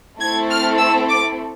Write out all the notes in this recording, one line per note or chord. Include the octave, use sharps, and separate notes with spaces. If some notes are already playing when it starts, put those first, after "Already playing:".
A3 C4 E4 A4 G#6
F6
E6
D6